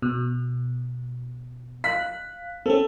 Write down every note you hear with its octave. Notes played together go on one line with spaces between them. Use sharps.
B2
F5 F#6 B6
C4 C#4 A4